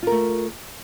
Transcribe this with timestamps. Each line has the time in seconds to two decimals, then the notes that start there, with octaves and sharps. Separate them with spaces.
0.03 F4
0.07 A#4
0.12 A3